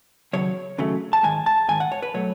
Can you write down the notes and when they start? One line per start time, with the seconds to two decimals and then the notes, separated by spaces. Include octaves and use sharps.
0.33 D#2 C#3 F#3 C#5
0.78 D#2 C#3 F#3 A3
1.13 A5
1.23 G#2 D#3 G#3 G#5
1.46 A5
1.68 G#2 D#3 G#3 G#5
1.80 F#5
1.92 C#5
2.03 B4
2.14 B2 F#3 A3 C#5